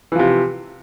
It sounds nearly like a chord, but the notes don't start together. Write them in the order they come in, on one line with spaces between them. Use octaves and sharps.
E3 F3 C3